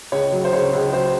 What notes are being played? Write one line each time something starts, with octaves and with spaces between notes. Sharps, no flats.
C#2 C#5
F#3
C5
C#3 C#5
C#2
F#3 C5